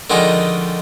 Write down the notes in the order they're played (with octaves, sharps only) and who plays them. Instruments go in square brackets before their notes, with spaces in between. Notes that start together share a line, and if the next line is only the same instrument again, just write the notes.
[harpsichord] D3 D#3 F3 G#3 D#4